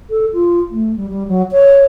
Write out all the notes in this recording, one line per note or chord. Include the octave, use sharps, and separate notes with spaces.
A4
F4
A3
G3
G3
F#3
C#5